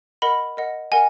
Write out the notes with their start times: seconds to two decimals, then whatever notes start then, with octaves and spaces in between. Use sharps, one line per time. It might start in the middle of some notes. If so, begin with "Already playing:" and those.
0.22 A#4 D#5 F#5 B5
0.57 A#4 D#5 F#5
0.92 A#4 D#5 F#5 G#5